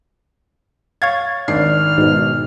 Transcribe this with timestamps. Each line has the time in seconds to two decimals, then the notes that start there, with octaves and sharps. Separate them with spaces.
1.02 C#5 F5 G#6 A6
1.48 G#1 D4 F6 C7
1.98 G#2 B2